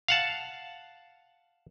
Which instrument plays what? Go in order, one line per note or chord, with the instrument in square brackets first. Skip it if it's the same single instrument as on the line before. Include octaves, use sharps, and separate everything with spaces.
[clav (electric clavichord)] F5 F#5 A5